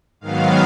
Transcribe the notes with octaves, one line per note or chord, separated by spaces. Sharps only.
G#2 D#3 F#3 B3 F5